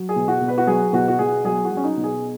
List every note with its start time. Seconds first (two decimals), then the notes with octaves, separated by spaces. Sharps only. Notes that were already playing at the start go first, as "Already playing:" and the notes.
Already playing: F#3
0.09 G#4
0.16 B2
0.28 F#4
0.41 B2
0.48 B4
0.58 F#4
0.67 F#3 G#4
0.93 B2 F#4
1.08 F#4
1.19 B2 G#4
1.45 F#3 G#4
1.65 F#4
1.71 F#3
1.77 C#4
1.84 D#4
1.97 B2
2.04 G#4